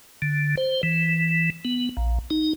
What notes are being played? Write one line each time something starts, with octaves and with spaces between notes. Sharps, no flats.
D3
C5
E3
B3
A#1
D#4